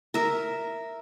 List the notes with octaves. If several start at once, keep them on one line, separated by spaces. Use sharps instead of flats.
A#4 E5